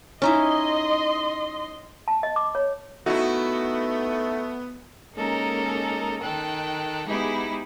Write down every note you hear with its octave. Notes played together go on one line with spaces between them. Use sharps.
C#4 D#4 E4 D#5 C6
A5
D#5
D6
C#5
A3 B3 D#4 E4 F#4
G#3 A#3 C#4 D#4 A4 A#4
D#3 A4 G5 F#6
G#3 B3 D#4 E4 G4 G#4